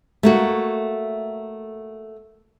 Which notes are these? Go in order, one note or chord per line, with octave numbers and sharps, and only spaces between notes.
A3 A#3 F#4